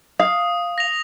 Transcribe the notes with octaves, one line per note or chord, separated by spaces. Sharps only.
F5 D#6
A#6 F7